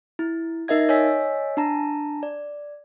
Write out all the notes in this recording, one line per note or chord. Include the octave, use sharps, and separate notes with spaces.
E4
D#4 A#4 D#5 E5 G#6
C#5 D#5 G#5 E6 B6
D4 A5 A#5
D5